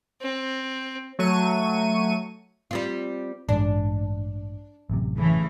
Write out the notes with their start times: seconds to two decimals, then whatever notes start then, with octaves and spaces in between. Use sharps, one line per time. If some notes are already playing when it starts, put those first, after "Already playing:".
0.21 C4
1.19 F#3 A3 C#6 D#7
2.71 G3 C4 F4
3.49 A1 G2 G#3 D4
4.90 A1 F#2 C3
5.18 C#3 E3 A3